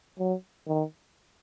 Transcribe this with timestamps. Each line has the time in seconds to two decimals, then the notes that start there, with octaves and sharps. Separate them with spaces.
0.19 F#3
0.68 D#3